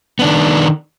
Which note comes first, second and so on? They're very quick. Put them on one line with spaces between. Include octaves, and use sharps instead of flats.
B3 D4 D#3